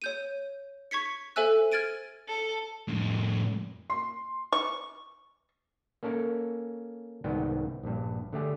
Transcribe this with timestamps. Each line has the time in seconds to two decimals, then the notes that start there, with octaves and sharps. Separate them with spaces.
0.02 C#5 G6 D#7
0.91 C#6 G#6 B6 C#7
1.36 A4 C5 E5 G#5 E6 F#6
1.72 F6 G#6 A6 D7 D#7
2.29 A4
2.88 F2 A2
3.90 C6
4.52 C#6
6.03 A#3 C#4 A4 A#4
7.24 C2 G#2 D#3 B3 D#5 G5
7.83 A#1 G2
8.33 D3 A3 G4 G#4